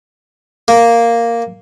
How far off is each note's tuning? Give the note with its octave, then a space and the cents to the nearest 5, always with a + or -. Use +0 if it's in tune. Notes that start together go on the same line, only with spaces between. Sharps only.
A#3 -5